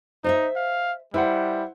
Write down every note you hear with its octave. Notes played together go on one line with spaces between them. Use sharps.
D#4 C5 D#5 E5
F5
G3 E4 B4 C5 F#5